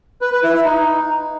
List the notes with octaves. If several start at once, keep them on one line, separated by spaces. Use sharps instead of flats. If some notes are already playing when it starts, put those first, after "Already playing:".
B4
B4
E4
E4
D#4